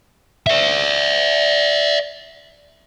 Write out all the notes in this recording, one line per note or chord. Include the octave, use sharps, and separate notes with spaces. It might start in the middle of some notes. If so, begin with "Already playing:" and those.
D5 E5